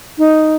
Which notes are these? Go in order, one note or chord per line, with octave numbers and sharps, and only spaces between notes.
D#4